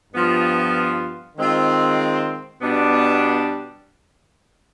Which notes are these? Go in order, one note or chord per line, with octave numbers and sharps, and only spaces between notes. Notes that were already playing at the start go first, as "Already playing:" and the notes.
G2 F3 B3 F4
D#3 G#3 C4 F4
B2 G3 B3 D4